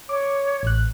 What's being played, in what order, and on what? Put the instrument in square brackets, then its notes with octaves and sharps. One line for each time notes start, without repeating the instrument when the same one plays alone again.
[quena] C#5 [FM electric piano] D6
[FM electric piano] A1 F#6